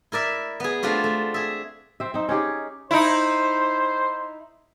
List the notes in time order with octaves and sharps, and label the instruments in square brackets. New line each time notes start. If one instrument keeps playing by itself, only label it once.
[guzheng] E4 A#4 D5 E5
B3 G#4
A3 C4 D4 F4 F#4
A3
G#4 E5
[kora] C4 E5
C4 D#4
C#4 D#4 G4 G#4
[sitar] D#4 E4 [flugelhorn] C5